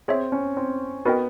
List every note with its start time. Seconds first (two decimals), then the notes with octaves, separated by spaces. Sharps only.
0.08 C4 G#4 C#5 E5
0.32 C#4
0.57 C4
1.05 B3 D#4 F#4 A#4 D#5 G5